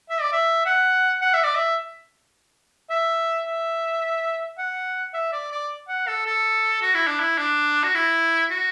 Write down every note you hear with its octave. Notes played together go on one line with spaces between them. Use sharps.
E5
D5
E5
F#5
F#5
E5
D5
E5
E5
E5
F#5
E5
D5
D5
F#5
A4
A4
F#4
E4
D4
E4
D4
F#4
E4
F#4